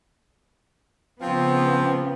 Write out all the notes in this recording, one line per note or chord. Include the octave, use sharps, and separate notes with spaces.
C#3 F3 B3 C4